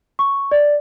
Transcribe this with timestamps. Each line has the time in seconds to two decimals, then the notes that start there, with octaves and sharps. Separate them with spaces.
0.19 C#6
0.51 D5